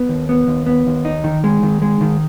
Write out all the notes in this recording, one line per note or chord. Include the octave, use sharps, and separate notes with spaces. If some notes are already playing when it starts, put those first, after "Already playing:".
Already playing: B3
D#2
B3
D#2
B3
D#2
D#4
D#3
G#3
D#3
G#3
D#3